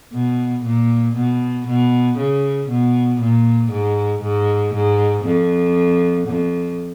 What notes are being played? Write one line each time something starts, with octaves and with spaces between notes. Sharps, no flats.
B2
A#2
B2
B2
C#3
B2
A#2
G#2
G#2
G#2
F2
F2